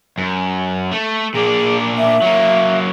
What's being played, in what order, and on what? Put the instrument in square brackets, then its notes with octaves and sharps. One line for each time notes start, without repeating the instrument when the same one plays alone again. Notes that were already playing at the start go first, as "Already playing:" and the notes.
[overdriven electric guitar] F#2
A3
[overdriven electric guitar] A#2 D4 [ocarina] G#4
[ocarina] E5
[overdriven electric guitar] F#3 A#3